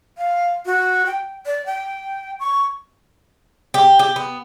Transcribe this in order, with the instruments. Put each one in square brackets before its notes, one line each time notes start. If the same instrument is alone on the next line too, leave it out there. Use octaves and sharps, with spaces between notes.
[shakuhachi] F5
F#4
G5
D5
G5
C#6
[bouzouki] G4
G4
B3